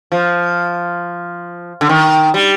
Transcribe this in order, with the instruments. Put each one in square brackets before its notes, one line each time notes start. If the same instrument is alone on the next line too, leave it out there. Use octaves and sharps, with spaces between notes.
[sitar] F3
D3
D#3
G3